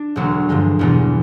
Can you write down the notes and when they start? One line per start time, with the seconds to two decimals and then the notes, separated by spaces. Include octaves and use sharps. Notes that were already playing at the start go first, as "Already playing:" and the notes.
Already playing: D4
0.16 E1 D2 D3 F#3 A#3
0.49 G2 D3 F3 G#3
0.79 E1 E2 B2 G3 B3